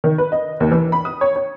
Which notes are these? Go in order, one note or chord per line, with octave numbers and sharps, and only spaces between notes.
D#3
B4
D#5
D#2
E3
B5
D#6
C#5
C#5